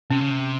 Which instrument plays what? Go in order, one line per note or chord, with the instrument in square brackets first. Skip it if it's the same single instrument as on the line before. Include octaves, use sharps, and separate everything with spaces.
[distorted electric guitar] C3 [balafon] C#4
[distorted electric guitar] C#3
C3